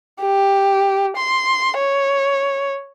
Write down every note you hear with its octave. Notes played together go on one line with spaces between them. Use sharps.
G4
C6
C#5